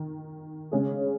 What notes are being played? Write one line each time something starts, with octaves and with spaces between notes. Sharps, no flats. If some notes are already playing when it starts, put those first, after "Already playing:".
Already playing: D#3
C#3 G#3 C#4 G#4